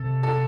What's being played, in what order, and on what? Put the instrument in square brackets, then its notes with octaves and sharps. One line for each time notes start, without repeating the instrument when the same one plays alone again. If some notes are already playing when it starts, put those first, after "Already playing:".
Already playing: [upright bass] C3 [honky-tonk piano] A4
[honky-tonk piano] A4